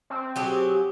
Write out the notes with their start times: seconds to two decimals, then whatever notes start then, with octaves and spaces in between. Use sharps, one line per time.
0.10 C4
0.36 F#3 G4 G#4